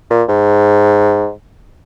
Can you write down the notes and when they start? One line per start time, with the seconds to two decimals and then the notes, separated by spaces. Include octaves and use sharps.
0.11 A#2
0.29 G#2